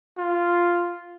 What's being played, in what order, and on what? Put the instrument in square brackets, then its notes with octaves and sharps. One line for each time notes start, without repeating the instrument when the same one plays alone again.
[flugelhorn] F4